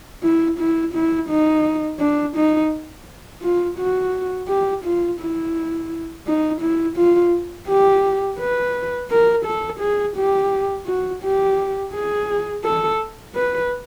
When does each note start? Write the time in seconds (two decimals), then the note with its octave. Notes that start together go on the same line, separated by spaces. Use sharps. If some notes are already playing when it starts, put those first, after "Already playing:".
0.23 E4
0.59 E4
0.94 E4
1.30 D#4
2.00 D4
2.36 D#4
3.42 F4
3.78 F#4
4.48 G4
4.84 F4
5.20 E4
6.26 D#4
6.61 E4
6.96 F4
7.68 G4
8.39 B4
9.10 A#4
9.45 A4
9.80 G#4
10.16 G4
10.87 F#4
11.23 G4
11.94 G#4
12.64 A4
13.35 B4